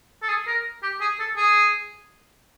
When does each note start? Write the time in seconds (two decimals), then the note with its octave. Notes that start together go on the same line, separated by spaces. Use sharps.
0.22 A4
0.28 G#4
0.47 A#4
0.83 G4
1.01 G#4
1.19 A4
1.37 G#4